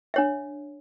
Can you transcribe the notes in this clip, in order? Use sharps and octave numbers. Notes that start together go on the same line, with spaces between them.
D4 C#5 E5